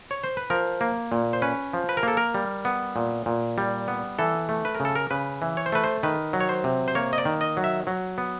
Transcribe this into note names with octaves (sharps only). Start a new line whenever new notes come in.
C#5
C5
B4
F3 A#4
A#3
A#2
C5
C#4 B4
F3
B4
A#4
A#3 A4
A#4
G3
B3
A#2
A#2
G3
B3
E3 A4
A3
B4
A#4
C#3 A4
A#4
C#3 B4
E3
C#5
C5
A3 B4
C5
D#3 B4
F#3
C#5
C5
C3
C5
A#3 C#5
D#5
D5
D#3
D#5
F#3
E5
F#3
B3